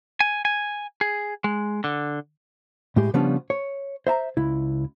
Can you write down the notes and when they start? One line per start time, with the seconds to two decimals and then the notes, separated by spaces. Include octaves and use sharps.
0.20 G#5
0.45 G#5
1.01 G#4
1.44 G#3
1.84 D3
2.96 A2 G#3 G4
3.14 C#3 F3 G3 B3 C#4 D4
3.50 C#5
4.07 C5 E5 A5 A#5
4.37 C#2 E4